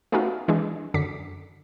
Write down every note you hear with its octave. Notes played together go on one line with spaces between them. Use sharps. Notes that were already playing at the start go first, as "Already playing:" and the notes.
A3 B3 C#4 D#4 F4 F#4
E3 G#3 D4 G#4
F#2 D3 D6 B6 C#7